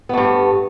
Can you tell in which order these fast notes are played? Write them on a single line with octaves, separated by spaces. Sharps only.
B3 A3 G2